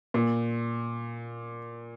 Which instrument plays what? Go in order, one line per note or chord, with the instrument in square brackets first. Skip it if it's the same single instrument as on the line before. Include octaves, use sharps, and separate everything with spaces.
[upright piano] A#2